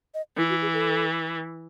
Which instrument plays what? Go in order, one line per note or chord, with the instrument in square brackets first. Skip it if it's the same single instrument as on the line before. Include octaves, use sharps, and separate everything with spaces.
[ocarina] D#5
[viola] E3 [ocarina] E4
[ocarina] F#4
G#4
A4